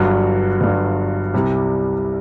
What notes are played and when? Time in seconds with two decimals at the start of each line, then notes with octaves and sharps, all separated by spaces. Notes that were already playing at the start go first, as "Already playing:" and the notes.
Already playing: G1 G2 F#3
0.61 G1 G2 F#3
1.34 C2 C3 G3